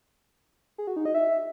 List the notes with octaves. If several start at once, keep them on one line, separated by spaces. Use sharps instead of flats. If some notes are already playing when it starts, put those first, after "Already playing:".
G#4
F#4
D#4
D#5
E5